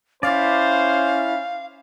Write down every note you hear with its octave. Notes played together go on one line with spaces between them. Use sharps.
C#4 E4 C5 D5 F5